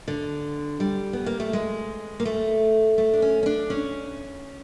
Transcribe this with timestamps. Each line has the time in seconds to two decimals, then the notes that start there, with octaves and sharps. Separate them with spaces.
0.08 D3
0.80 G3
1.13 B3
1.26 A#3
1.40 A3
1.53 G#3
2.20 A#3
2.25 A3
2.98 A3
3.13 D4
3.22 C#4
3.43 C#4
3.46 D4
3.70 C#4